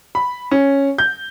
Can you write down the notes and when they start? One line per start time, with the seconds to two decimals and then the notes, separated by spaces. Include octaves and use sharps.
0.15 B5
0.51 C#4
0.98 G6